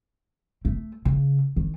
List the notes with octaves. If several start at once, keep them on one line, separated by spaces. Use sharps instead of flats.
A3
C#3
D#3